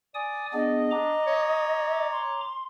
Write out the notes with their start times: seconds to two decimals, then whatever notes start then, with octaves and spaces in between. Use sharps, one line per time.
0.15 D5 G#5 D#6
0.53 B3 D4 G#4 D#5
0.91 D4 A#5 D6
1.27 C#5
2.12 C6